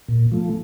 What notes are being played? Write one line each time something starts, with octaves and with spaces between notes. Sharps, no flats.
A#2
F3 A3